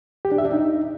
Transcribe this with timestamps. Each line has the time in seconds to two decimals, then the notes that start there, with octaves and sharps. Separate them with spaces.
0.25 G4
0.32 D4
0.38 E5
0.45 D4
0.52 D#4